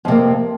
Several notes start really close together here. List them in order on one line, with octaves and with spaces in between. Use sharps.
F2 C3 A#3